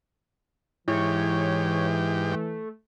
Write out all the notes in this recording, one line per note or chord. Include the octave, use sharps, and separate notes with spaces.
G#2 E3 E4 G4 C#5
A3